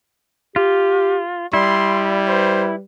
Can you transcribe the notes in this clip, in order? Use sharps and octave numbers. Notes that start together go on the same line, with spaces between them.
F4 G4
G3 E4 D5 C6
B4 C5